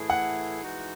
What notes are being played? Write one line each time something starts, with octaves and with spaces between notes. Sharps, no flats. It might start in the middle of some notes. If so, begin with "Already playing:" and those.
Already playing: A2 E3 A3 E4 G#4
F#5
E3 G#3 D#4 F#4